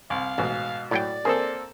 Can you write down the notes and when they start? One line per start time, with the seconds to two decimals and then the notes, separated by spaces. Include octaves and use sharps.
0.10 C2 F5
0.38 A1 G#2 B2
0.91 A2 F#3 D5 G5
1.25 A#3 C4 G#4 A4